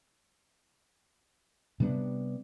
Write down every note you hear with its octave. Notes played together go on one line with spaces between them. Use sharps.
C3 G3 B3 D4